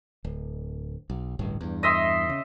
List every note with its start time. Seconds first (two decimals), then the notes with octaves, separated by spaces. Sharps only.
0.24 D1
1.10 B1
1.39 D1 A1 G2
1.61 E2 G2
1.83 D#5 E5 C6
2.29 C#3